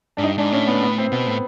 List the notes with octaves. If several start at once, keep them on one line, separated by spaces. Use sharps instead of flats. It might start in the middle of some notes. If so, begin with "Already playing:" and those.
G#2 D4
G2 D#4
G#2 D4
A2 C#4
B3
B3
C4
B2 B3
A2